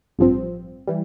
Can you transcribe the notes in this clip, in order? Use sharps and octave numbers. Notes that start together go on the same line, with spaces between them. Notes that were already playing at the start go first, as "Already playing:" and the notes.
A1 G2 F3 C4
E3 G3